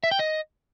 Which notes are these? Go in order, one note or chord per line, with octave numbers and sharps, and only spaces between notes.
E5
G5
D#5